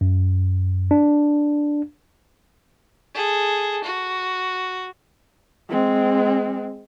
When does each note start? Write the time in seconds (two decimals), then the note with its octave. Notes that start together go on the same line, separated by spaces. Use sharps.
0.01 F#2
0.91 D4
3.14 G#4 A4
3.84 F#4
5.69 G#3 C4